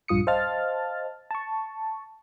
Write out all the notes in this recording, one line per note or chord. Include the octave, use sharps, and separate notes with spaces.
A#1 G2 F4 D#6 C#7
C5 D#5 F5 A5 F6 A6
A5 C#6